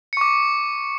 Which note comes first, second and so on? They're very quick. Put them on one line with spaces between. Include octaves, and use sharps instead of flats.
C#7 C#6 D6